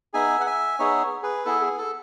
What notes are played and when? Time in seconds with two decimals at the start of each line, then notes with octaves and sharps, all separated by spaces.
0.14 B3 D#4 G#4 E5 G#5
0.41 F#5
0.46 E5 G#5
0.79 B3 D#4 G#4 C#5 E5
1.23 G#4 B4
1.45 B3 E4 G#4 A4
1.62 G#4
1.78 A4